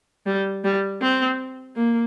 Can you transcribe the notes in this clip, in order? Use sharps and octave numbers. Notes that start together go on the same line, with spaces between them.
G3
G3
C4
A#3